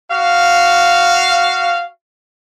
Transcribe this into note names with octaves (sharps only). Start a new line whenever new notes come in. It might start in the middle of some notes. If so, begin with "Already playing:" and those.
F#4 F5